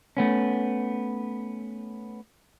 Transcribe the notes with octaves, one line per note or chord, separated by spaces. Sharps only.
A3 B3 C#4